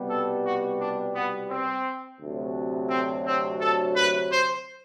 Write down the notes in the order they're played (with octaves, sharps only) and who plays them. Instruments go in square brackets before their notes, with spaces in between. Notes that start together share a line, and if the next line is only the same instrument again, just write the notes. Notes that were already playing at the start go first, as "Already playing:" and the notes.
Already playing: [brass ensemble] C2 B2 G3 B3
A4
F#4
D4
B3
C4
D2 C3 F#3
C4
C4
A4
B4
C5